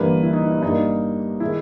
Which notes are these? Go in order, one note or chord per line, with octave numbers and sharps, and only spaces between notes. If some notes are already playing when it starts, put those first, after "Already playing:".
Already playing: G1 G2 E3 G3 A#3 B4
E4
D#4
D#4
G2 G3 A#3 D#4
D#3 G#3 E4